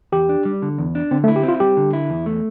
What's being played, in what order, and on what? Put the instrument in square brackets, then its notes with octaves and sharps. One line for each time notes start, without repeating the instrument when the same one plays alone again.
[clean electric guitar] E2 [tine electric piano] G4
[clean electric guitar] D4
G3
D3
E2
D4
[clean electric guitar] D3 [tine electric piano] C4
[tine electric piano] A3
[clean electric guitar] E4
[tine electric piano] G4
[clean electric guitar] C4
[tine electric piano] F4
[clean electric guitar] G3 [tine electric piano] G4
[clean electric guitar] D3
E4
E2
A3